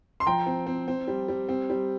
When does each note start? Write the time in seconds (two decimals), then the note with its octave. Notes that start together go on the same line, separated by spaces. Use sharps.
0.20 C6
0.26 F3 G5 A#5
0.46 C4
0.66 C4
0.88 C4
1.08 G3
1.28 G3
1.49 C4
1.70 G3